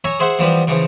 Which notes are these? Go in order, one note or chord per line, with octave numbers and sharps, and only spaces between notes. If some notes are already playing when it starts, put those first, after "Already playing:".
C#5 E5 G#5 A#5
G#4 C5 E5 F#5
E3 F3 G3 B3
C#3 E3 F3